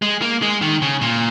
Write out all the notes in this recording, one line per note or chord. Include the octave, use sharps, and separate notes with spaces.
G#3
A#3
G#3
D#3
C#3
A#2